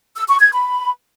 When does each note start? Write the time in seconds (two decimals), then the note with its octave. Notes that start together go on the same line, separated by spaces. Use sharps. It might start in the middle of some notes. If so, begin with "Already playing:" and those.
0.16 E6
0.28 C#6
0.40 G#6
0.52 B5